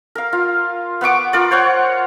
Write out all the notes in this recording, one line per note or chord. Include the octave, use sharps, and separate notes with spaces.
A#4 F5
F4
B3 F#5 C#6 D6
F4 A#4 D5
C5 C#5 F#5